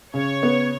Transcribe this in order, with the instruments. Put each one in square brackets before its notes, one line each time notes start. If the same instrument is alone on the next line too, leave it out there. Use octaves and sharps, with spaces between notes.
[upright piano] C#3 [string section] C#5
[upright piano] B3